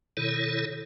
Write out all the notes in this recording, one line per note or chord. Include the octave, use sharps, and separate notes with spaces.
B2 D#3 E4 A4 C#5